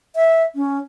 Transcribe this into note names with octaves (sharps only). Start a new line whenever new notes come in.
E5
C#4